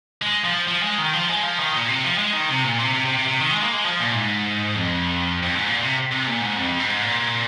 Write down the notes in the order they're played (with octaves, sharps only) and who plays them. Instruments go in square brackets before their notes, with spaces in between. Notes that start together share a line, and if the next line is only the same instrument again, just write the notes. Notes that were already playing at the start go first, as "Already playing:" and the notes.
[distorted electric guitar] G#3
F3
F3
G#3
D#3
F3
G#3
F3
D#3
A#2
C3
F3
G#3
D#3
C3
A#2
C3
C3
C3
C3
C3
D#3
G#3
A#3
G#3
F3
A#2
G#2
F2
F2
G#2
A#2
C3
C3
A#2
G#2
F2
G#2
A#2